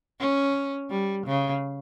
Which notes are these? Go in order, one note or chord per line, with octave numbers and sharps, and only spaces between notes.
C#4
G3
C#3